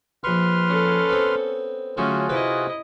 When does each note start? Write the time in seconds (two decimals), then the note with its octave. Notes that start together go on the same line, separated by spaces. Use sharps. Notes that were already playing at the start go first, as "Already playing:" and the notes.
0.24 A#1 B4 C6 C#6 F6
0.68 C#4 A4
1.09 B3 C4
1.97 D3 F#3 A3 C#4 F4 F#4 G#4
2.29 C3 E4 B4 D#5